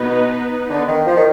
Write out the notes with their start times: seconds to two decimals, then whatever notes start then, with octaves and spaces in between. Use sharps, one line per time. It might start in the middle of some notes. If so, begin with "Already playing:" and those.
Already playing: B2 B3 D#4 B4
0.70 D3
0.87 D#3
1.06 F3
1.16 D#3